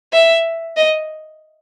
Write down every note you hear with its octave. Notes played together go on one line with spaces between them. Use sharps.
E5
D#5